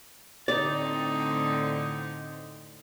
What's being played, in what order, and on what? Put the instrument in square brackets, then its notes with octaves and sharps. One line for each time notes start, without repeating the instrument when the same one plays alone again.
[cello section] A2 D3 C4 [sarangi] D#4 [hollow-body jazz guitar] D5